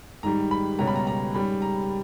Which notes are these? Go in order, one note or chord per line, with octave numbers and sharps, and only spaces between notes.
G#2 D#3 G3 A#5
B5
C#2 B2 G3 C#4 A#5
B5
A#5
A#5
G#2 G3 C#4 B5
A#5